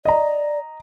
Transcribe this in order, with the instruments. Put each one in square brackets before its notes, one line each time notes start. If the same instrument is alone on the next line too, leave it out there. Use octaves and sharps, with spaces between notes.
[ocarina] D5 [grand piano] D#5 A#5